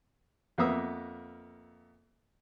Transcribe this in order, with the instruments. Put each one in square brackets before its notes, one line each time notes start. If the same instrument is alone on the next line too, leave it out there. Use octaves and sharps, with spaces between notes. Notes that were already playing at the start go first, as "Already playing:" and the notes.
[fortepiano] F2 A#3 B3 E5 D#6